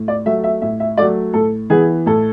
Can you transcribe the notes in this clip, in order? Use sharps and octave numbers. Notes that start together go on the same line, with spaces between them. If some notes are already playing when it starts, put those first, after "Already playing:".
Already playing: A2
D5
F#3 A3 E5
E5
A2 E5
E5
F#3 A3 D5
A2 A4
E3 B3 G#4
A2 A4